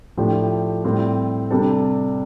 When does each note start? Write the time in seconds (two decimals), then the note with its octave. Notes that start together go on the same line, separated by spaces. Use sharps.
0.17 A2 F3 A3 D4 G4
0.84 A2 G3 C4
1.50 C3 G3 D4 A4